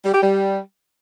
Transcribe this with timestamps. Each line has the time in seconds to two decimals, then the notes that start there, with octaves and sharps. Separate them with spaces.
0.05 G3
0.14 G4
0.22 G3